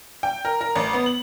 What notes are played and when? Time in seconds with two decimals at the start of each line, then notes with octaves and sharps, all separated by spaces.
0.23 G5
0.45 A#4
0.61 A#4
0.76 A1
0.93 B3
1.06 F#7